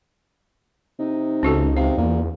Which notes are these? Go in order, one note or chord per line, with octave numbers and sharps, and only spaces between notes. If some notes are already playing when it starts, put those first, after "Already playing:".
C3 D#4
C#2 C#4 F#4 A4
C3 F5
E2 A#2